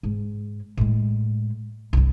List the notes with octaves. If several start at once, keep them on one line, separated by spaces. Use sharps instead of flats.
G#2
A2 G#3
C2 G2